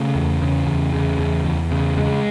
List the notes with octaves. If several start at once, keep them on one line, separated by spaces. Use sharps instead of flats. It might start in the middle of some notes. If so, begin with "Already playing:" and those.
Already playing: C#3 A3
E2
C#3
E2
C#3
E2
E2
C#3
C#3 G#3